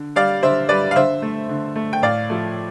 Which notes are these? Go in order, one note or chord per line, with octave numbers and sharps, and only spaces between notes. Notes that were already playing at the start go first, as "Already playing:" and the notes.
Already playing: D3
G3 D5 F5
D3 C5 E5
G3 B4 D5
F5
D3 C5 E5
A3
D3
A3
G5
A2 D5 F5
F3 A3